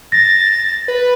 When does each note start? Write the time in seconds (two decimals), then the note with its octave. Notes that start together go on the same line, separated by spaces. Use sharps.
0.12 A6 A#6
0.88 B4